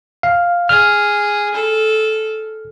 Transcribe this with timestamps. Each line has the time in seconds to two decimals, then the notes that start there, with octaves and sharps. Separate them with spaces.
0.23 F5
0.69 G#4 F6
1.55 A4